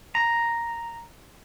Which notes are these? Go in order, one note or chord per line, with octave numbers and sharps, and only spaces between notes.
A#5